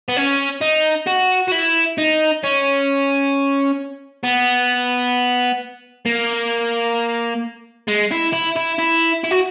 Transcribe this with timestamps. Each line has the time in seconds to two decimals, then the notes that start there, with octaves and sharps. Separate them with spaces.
0.08 B3
0.16 C#4
0.61 D#4
1.07 F#4
1.48 F#4
1.52 E4
1.98 D#4
2.44 C#4
4.24 B3
6.06 A#3
7.88 G#3
8.11 E4
8.33 E4
8.56 E4
8.79 E4
9.24 E4
9.31 F#4